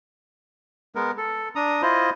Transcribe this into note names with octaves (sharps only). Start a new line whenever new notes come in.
G#3 B3 A#4
A4
D4 A#5 D#6
E4 F4 C5 D#5